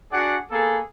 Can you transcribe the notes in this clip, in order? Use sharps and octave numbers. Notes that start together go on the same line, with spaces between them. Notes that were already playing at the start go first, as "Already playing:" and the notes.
D4 F#4 G#4 D5 F#5
A#3 B3 G#4 A4